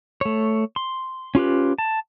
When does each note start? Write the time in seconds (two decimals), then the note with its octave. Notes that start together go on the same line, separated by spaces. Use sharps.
0.21 A3 C#5
0.76 C6
1.35 C#4 F4 G4 B4
1.78 A5